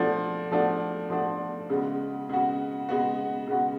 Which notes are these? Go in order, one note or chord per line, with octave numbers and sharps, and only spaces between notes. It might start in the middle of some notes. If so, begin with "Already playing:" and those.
Already playing: F3 A3 D4 F#4
F3 A3 D4 F#4
F3 A3 D4 F#4
C#3 G#3 B3 F#4
C#3 G#3 B3 F#4
C#3 G#3 B3 F#4
C#3 G#3 B3 F#4